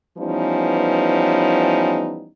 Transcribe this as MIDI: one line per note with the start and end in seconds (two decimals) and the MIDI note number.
0.18 2.29 52
0.18 2.29 53
0.18 2.29 55
0.18 2.29 59
0.18 2.29 61
0.18 2.29 63